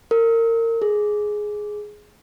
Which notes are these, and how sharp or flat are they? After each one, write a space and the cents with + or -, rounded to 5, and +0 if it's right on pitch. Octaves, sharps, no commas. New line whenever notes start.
A#4 -30
G#4 +10